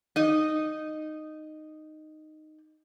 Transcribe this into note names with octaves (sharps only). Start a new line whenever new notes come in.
D#4 D#5